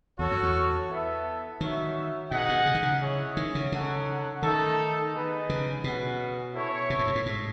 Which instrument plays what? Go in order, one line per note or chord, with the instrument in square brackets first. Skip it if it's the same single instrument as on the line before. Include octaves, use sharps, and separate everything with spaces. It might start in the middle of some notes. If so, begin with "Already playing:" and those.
[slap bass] E2 [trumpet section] F#4 A4 C#5
[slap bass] F#2
E2
[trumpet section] B3 E4 A4 E5
[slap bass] D#3 [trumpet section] D#4 F#4 C#5 E5
[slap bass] B2 [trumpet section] D#4 G#4 D#5 F#5
[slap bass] B2
C#3
D#3
C#3
[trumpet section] E4 G#4 C#5
[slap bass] D#3
C#3
[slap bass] C#3 [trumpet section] D#4 A4 C#5 F#5
[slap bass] D#3 [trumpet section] A3 D#4 A4
[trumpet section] B3 D#4 G#4 B4 D#5
[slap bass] C#3
[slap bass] B2 [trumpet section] C#4 G#4 B4 F#5
[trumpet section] E4 A4 C#5
[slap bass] B2
A2
G#2
A2
G#2